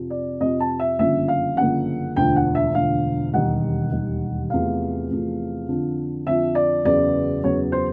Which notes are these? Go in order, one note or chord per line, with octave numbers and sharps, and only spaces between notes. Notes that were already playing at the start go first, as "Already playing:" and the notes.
Already playing: F2 C3 F3
D5
F2 C3 F3 D#5
A5
E5
G1 F#2 C#3 F3 A#3 E5
F5
G1 F#2 C#3 F3 A#3 F#5
E1 D2 D3 F3 G5
F#5
E5
E1 D2 D3 F3 F5
E1 D#2 D#3 G3 F#5
E1 D#2 D#3 G3
E2 C3 F3 A3 F5
E2 C3 F3 A3
F2 D3 F3
F2 D3 F3 E5
D5
F#1 E2 C#3 F#3 B3 D5
F#1 E2 C#3 F#3 B3 C#5
C5